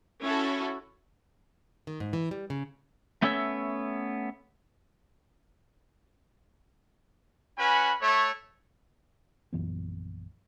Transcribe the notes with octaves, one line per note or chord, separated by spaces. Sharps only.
C#4 E4 F#4 A4
D#3
G#2
E3
G3
C#3
A3 B3 C#4 A4 C#5 E5
C#4 F#4 B4 G#5 B5
A3 C#5
A#1 F#2 E3 B3